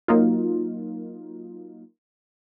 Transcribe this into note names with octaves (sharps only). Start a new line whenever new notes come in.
F#3 A#3 D#4 F4